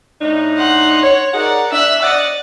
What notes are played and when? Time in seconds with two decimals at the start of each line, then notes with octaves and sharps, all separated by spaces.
0.22 A2 D4 D#4
0.57 F#5 C6
1.04 C#5
1.34 D#4 G#4 A#4 D5 F#5
1.72 D4 E5 E6 F#6
2.02 D5 D#5 F#5